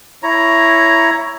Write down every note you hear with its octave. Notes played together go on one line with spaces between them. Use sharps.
E4 C#5 A#5